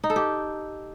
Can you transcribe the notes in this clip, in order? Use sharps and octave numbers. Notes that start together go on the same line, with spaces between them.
D#4
A4
G4